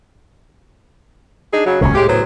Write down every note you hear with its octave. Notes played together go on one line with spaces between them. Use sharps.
D4 D#4 G#4
C#3 F#3
D#1 C#2 C3 C#4
A2 G#3 G4
F#3 B3 C5